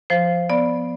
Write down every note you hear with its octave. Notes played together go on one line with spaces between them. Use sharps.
F3 C5
B3 D5